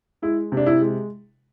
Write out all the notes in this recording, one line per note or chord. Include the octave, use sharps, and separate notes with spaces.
G#3 E4
C3
D4
E4
G#3